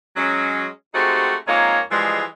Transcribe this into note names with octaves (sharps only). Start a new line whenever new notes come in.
F#3 G#3 C#4
G#3 A3 C4 D#4 F#4 G4
F2 G#3 A#3 D#4 F4 C#5
E3 F3 G3 G#3